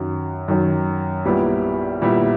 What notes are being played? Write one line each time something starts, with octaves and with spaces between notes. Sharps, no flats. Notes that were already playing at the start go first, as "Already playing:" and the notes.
Already playing: F#2 D#3 F#3
F#2 D#3 F#3
A#1 A#2 G3 B3 E4
A#1 A#2 G3 B3 E4